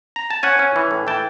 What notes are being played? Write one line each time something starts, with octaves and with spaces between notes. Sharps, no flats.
A#5
A5
C#4 F#5 G#5
C#4
E3
A2
E3 G5 A5